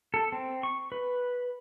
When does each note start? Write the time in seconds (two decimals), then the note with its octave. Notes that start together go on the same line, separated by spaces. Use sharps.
0.14 A4
0.32 C4
0.63 C#6
0.92 B4